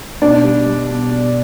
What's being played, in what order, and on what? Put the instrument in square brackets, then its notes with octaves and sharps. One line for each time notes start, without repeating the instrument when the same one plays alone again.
[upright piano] B2 D4
G3
G3
B2
B2